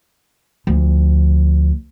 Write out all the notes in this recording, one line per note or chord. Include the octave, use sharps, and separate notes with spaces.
D2 F3